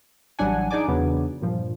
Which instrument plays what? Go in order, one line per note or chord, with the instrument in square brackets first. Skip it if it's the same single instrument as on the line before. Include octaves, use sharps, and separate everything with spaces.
[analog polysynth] A1 F#3 G3 D4 F#5 G#5
D4 D#4 G#4 D5 G#5 D6
E2 C#3 F#3 B3 D4
G2 A#2 F3